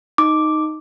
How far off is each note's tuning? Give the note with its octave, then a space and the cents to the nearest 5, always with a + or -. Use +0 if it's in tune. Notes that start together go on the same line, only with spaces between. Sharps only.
D#4 +0 D6 +0